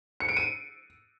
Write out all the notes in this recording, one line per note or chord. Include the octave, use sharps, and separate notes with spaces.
C#7
D7
D#7